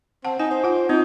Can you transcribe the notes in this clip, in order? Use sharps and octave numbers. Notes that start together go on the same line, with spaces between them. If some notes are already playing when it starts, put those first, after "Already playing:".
C4 F#5 A5
D#4 G#5
C5
F4 F#5
C4 D#4 F4